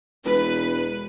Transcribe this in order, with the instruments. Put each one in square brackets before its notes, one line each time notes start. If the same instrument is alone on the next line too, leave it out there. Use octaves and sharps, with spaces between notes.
[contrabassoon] E1 [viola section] B4